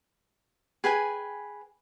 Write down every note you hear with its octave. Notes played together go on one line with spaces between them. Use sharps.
G#4 B4 G5 G#5